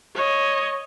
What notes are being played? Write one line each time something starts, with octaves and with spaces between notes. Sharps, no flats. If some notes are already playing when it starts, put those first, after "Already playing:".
C#5 D#5